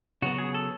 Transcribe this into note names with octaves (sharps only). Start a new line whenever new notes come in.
C#3 F#3 B3 F#4
G#4
A4